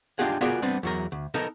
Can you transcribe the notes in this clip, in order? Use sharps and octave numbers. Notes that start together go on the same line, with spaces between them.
D4 D#4 F4 G4 G#4 F#5
B3 F4 F#4 G#4 A#4 D5
G3 B3 C4 D4
E2 F#3 A#4
D2
B3 D#4 A4 A#4